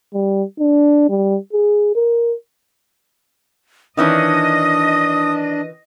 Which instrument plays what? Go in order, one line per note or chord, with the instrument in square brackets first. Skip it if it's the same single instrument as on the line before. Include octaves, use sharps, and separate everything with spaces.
[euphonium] G3
D4
G3
G#4
A#4
[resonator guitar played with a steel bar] D#3 E3 C#4 [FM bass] D4 [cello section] D#5 [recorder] D#6